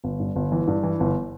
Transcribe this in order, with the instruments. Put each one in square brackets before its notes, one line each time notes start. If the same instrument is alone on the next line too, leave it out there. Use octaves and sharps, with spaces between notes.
[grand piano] G1
G2
G1
E3
G2
E3
G1